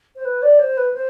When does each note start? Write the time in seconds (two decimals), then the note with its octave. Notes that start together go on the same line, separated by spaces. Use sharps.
0.16 C5
0.25 B4
0.42 D5
0.59 C5
0.77 B4
0.93 C5